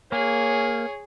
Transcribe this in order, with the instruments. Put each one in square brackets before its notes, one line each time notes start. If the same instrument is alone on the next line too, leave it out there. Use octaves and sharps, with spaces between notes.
[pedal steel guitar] A#3 [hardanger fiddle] G#4 [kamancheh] C#5